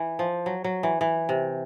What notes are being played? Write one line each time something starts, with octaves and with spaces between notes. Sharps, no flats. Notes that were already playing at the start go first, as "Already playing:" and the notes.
Already playing: E3
F3
F#3
F#3
E3
E3
C3